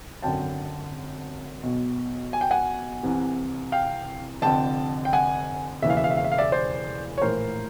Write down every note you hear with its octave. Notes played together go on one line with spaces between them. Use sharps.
G#1 F#2 D3 G5 A5
B1 B2
G#5
G5
F#5 G#5
C2 C3 E3
F5 G5
F1 F2 D3 G5 A5
G5
F#5 G#5
E1 D#2 C#3 E3 E5
F5
E5
F5
E5
F5
E5
F5
D5 E5
C5 D5
C#5
A#1 A2 E3 A#4 C5